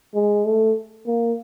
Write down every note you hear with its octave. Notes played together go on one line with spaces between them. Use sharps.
G#3
A3
A#3